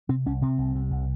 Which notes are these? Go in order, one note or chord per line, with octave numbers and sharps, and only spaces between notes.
C3 C4
C2 C#4
C3 C4
C2
C3
C2